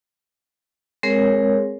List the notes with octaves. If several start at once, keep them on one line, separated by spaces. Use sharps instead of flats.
G#3 C4 G#4 A#4 C#5